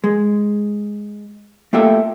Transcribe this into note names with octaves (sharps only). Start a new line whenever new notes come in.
G#3
A3 A#3 F4 G4 A4 E5